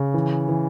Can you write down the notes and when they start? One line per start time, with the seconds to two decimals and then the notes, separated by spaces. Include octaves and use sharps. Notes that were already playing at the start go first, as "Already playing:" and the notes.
Already playing: C#3
0.14 E3
0.49 E3